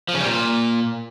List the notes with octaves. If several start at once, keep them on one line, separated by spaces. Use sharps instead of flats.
F3
C#3
G3
A#2